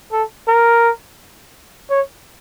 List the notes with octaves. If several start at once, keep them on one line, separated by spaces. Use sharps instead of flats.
A4
A#4
C#5